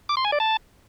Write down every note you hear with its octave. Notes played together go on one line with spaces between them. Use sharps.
D6
C6
G#5
D5
A5